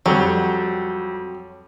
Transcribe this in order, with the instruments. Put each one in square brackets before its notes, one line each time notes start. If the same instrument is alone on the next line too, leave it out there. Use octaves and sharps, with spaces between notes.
[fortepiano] F2 G3 [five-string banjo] F#3